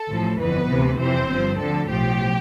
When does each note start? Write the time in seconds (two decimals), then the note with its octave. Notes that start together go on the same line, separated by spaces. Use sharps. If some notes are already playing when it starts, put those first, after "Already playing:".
Already playing: A4
0.10 A1 A2 F3
0.39 G1 F2 E3 B3 B4
0.69 D2 C3 E3
0.99 F2 C3 E3 C4 C5
1.30 G1 G2 F3
1.59 D2 D3 F3 A4
1.89 B1 A2 F3 G4